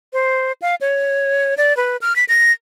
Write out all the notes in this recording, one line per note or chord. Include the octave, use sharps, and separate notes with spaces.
C5
F5
C#5
D5
B4
F6
B6
A#6